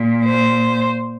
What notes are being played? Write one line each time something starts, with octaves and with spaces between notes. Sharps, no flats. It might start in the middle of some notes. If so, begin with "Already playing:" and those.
Already playing: A#2
C5